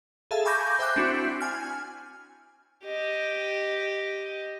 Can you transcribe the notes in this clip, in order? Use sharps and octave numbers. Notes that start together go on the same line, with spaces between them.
G#4 A4 E5 F5 A5
G#5 B5 C#6 D6 G6 A#6
C5 E5 G5 D6 F#6
C4 D4 E4 F#4
G#5 F6
G4 D#5